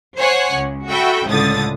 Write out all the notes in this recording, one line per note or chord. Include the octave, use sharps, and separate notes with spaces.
C5 C#5 F#5 G#5
C#2
F#4 A4 E5 G5 B5
C#2 A2 D3 D#6 A6